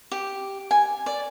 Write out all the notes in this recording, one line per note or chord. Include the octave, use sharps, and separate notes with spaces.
G4
G#5
D5